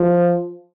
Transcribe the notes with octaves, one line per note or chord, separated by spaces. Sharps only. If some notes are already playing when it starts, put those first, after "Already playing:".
Already playing: F3